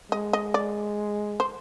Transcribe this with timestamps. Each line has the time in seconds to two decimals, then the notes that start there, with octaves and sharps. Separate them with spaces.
0.12 G#3 D#5
0.33 D#5
0.54 D5
1.40 C5